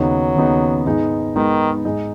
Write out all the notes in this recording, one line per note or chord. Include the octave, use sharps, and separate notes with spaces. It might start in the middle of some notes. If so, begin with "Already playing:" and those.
Already playing: D#2 C#3 F#3 B3 D#4
D#2 C#3 B3 D#4
G#2 G#3 B3 D#4
G#2 D#3 G#3 B3 D#4
G#2 G#3 D#4